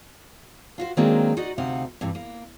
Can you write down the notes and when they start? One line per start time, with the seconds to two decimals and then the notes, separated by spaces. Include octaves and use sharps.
0.78 F4 F#4 C5
0.97 D#3 F#3 G#3 A#3 C4 D4
1.37 D#4 F#4 D5 D#5
1.58 D2 C3 C4 D#4 F5 F#5
2.01 G2 C3 E3
2.15 A#3